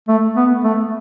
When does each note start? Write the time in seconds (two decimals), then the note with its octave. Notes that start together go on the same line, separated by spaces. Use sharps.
0.08 A3
0.36 B3
0.64 A3